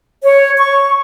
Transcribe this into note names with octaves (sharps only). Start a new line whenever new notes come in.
C#5
C#6